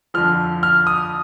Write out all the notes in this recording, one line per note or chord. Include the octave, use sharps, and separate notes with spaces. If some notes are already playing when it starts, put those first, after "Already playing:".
F2 D3 F3 F6
F6
D#6